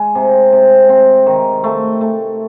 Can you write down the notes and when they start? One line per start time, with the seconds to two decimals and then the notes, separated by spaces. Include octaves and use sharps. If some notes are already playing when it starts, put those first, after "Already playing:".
Already playing: G#3
0.15 C3
0.53 C3
0.89 C4
1.26 D#3
1.64 A3
2.01 A3